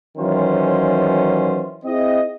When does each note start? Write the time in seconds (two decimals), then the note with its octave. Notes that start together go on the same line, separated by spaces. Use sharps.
0.18 D#3 E3 F#3 C#4 F4 C5
1.85 C4 E4 G#4 D#5